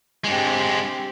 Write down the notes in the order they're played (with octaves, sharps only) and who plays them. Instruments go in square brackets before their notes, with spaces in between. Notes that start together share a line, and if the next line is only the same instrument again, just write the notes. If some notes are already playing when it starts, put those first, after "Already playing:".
[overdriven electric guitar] G2 G#3 [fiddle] C4 G4